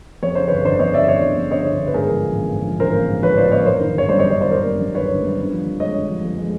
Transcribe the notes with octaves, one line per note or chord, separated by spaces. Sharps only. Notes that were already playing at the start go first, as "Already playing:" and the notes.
F2 C#5
C#3 C5
G1 B4 C#5
G1 C5 D5
F2 C#5 D#5
C#3 D5 E5
G1 C#5 D#5
G1
F2
C#3 C#5 D#5
G1
G1
B4
G#2 G#4 A#4
F3
A1
A#3
G#2
F3
A1 A#4 C5
A#3
G#2
F3 B4 C#5
A1 C5 D5
A#3 C#5 D#5
F#2 A#4 C5
D#3
G1 C#5
G3 C5 D5
C#5 D#5
F#2
C#5 D#5
D#3 C5 D5
G1 A#4 C5
G3
F#2
D#3 B4 C#5
G1
G3
D3
F3
F2
G#3 C#5 D#5
D3
F3
F2
G#3